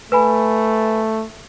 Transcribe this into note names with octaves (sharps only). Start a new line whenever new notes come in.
A3 B4 G#5 B5